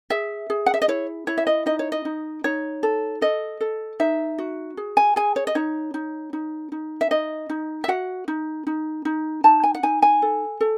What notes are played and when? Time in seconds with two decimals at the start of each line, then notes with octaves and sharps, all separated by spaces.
0.10 G#4 E5
0.50 G#4
0.66 F#5
0.74 E5
0.82 D#5
0.88 E4 C#5
1.27 E4 C#5
1.38 E5
1.47 D#5
1.66 D#4 D#5
1.79 C#5
1.92 D#5
2.05 D#4
2.44 D#4 C#5
2.83 A4
3.21 A4 D#5
3.61 A4
4.00 D#4 E5
4.38 F#4
4.77 G#4
4.97 G#5
5.16 G#4 G#5
5.36 C#5
5.47 D#5
5.55 D#4 C#5
5.94 D#4
6.33 D#4
6.72 D#4
7.01 E5
7.11 D#4 D#5
7.50 D#4
7.84 E5
7.88 F#4 F#5
8.28 D#4
8.67 D#4
9.05 D#4
9.44 D#4 A5
9.64 G#5
9.75 F#5
9.83 D#4 G#5
10.02 G#5
10.22 A4
10.61 A4